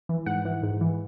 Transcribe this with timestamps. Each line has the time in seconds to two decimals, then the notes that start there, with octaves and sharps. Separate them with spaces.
0.09 E3
0.26 G#2 F#5
0.45 E3
0.63 G#2
0.81 E3